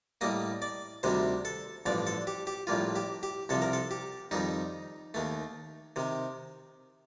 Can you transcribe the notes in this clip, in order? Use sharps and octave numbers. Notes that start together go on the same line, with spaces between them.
A2 G3 A#3 D#5
D5
D2 C3 D#3 G3 C5
A4
A1 G2 D3 F3 D5
A4
G4
G4
A#1 A2 G3 A#3 F4
G4
G4
C2 C3 F3 A4
A#4
A4
G4
F2 D#3 G3 D#4
D#2 D#3 A3
C3 D#3